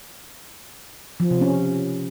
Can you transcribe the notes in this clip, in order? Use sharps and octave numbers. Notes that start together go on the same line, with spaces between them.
F3
C3
C#4